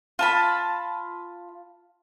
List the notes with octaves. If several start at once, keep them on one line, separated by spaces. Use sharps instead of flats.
F4 A5 B5